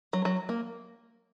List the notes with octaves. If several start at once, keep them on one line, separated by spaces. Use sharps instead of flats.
F#3
F#3
A#3